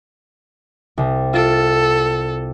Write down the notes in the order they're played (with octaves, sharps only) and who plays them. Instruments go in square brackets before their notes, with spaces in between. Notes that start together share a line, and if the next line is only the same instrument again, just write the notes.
[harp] C2
[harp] F4 A6 D7 [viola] A4